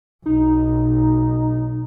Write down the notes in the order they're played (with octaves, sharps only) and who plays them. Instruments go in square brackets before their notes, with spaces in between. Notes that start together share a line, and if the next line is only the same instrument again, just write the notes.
[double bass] B1 [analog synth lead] D#4